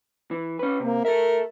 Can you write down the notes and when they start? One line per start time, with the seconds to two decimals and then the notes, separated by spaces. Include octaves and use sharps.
0.31 E3
0.59 C#4 B4
0.80 C3 A#3
1.05 A4 A#4 E5